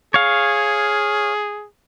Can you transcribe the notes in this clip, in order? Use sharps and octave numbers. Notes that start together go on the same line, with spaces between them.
G#4 C#5 F5